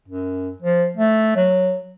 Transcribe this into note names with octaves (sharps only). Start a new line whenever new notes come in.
F#2
F3
A3
F#3